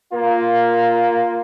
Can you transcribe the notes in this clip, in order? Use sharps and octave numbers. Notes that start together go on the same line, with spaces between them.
A#3 F4